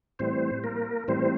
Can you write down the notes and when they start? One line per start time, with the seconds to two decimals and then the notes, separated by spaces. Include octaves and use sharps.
0.19 A2 E3 G3 C4 C5
0.64 A#3 A#4
1.08 A2 E3 G3 C4 C5